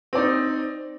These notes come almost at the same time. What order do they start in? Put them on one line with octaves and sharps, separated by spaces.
C4 D5 D#4